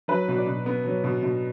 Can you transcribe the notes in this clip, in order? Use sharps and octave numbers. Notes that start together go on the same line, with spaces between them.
F#3 B4
B2
D5
B2
B3
F#3
B2
B2